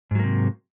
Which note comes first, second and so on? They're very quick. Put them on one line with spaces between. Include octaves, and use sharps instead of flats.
G#2 F#3 A#3 C3